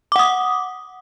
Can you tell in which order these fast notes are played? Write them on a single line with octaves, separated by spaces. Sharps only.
D6 F#5 D#6